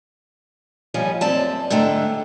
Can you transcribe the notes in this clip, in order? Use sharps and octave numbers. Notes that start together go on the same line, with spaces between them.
D#2 F3 G3 C#5 G#5
F#2 C4 D5 A5
G#2 D3 A3 A4 G5 A#5